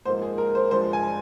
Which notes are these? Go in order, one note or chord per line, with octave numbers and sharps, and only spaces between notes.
G#2 F3 A#3 C5
G#4
A#4
C5
G2 F3 G#3 C5
G#5